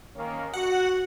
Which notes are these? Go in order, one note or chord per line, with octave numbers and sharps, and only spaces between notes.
D#3 A#3 C#4
F#4 F#5